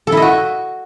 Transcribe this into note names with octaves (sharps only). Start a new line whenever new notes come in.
A4
E4
D#5
F#4